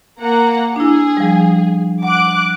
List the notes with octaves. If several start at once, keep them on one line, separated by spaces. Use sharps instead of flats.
A#3 F#5 A#5
D4 E4 G#4
F3 G3
F#5 D6 F#6